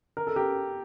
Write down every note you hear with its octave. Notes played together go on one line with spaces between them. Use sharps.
A#4
A4
G4 A#4